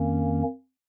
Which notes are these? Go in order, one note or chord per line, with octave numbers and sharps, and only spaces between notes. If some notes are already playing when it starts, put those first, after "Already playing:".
Already playing: F2 D#3 A#3 C#4